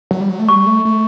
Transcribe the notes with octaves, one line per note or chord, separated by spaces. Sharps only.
F#3
G3
F#3
A3
G3 C#6
A3
A3